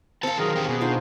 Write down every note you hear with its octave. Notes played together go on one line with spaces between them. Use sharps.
C4 A#4 F5 A5
D#3 F#3 G#4 A#4
E2 C#4 G4
B2 G4 G#4
D4 D#4 F4 G#4 C5